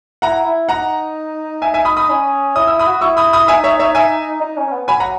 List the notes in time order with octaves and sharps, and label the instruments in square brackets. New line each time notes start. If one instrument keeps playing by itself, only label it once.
[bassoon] E4 [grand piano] F#5 A#5
[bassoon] E4
[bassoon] D#4 [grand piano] F#5 A#5
[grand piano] E5 G#5
E5 G#5
B5 D#6
B5 D#6
[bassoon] C#4
[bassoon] E4 [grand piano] D#6
[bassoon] E4 [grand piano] E6
[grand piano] B5 D#6
[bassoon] F#4
[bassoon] E4 [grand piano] C#6 E6
[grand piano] B5 D#6
B5 D#6
[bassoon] E4
[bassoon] D#4 [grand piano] E5 G#5
[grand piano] C#5 E5
C#5 E5
E5 G#5
[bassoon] D#4
C#4
C#4
B3
[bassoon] F#3 [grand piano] G#5 B5
[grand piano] F#5 A#5